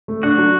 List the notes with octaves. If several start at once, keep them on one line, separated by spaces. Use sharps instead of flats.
A3
D4 F#4 F#5
F#3